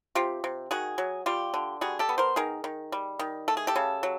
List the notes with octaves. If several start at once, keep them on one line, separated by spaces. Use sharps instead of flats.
C3 F4 G4
C3
D#3 F#4 G#4
F#3
G3 F4 G4
D3
G3 F#4 G#4
G4 A4
B3
A#4 C5
D#3 G#4 A#4
D#3
G3
D#3
A3 A4
G#4
G4 A4
C#3
F#3